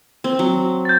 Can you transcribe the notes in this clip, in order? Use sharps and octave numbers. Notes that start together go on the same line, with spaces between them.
C4
F#3
G6 A6